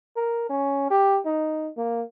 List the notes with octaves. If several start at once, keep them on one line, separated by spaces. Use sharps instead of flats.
A#4
C#4
G4
D#4
A#3